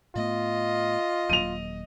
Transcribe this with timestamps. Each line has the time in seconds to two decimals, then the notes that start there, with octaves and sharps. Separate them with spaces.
0.15 A2 A3 B3 F4 D#5
1.29 D#1 F#3 A#3 D#7 F7